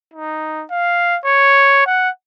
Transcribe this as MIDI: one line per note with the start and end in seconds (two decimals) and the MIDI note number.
0.14 0.64 63
0.71 1.18 77
1.25 1.86 73
1.87 2.10 78